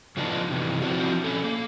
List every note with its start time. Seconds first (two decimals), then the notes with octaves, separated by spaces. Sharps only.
0.17 C#3 F3 B3 D4 D#4
0.50 C3 E3
0.82 F3 C4 D4 E4 F#4
1.24 C#4 A4
1.44 A#3